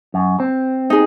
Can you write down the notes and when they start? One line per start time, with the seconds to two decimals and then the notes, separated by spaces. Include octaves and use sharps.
0.14 F#2
0.40 C4
0.90 D#4 G#4